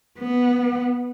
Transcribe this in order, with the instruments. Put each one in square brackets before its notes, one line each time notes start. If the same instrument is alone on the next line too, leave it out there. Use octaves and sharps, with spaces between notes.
[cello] B3